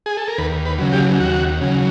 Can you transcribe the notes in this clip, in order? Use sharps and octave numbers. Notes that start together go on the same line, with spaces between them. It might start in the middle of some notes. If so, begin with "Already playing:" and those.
G#4
A4
A#4
D#2 B4
B4
C#3 F#3
G4
D#2 F#4
C#3 F#3